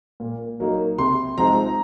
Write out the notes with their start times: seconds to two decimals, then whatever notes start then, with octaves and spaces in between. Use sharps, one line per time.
0.20 A#2
0.60 F#3 A#3 D#4
0.98 C3 C6
1.37 F3 G#3 C4 D#4 A#5